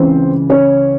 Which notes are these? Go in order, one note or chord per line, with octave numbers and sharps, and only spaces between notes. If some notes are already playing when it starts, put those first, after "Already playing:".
Already playing: C#2 C#3 E3 C4 C5
C#4 C#5